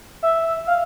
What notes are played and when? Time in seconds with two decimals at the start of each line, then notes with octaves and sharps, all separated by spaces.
0.23 E5
0.67 F5